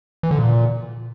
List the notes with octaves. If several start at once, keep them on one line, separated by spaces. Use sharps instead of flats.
E3
D3
A#2